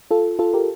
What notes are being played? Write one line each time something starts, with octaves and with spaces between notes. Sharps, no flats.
F4 A4
F4 A4
G4 A#4